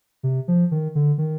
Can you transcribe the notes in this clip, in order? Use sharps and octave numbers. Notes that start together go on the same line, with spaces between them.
C3
F3
D#3
D3
D#3